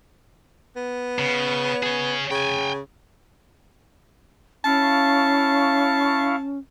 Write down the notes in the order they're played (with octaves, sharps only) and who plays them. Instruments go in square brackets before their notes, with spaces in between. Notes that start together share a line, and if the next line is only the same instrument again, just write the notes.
[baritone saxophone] B3
[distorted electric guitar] C#3
G#4 C#5
[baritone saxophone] C#3 [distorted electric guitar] G5 G#5
[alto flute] C#4 [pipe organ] E4 F5 C#6 [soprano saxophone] A5